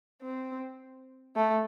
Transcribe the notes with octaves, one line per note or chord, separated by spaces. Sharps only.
C4
A3